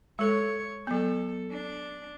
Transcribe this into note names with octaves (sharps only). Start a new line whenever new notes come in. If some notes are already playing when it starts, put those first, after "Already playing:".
G#3 A4 C#5
F#3 B3 A4
D4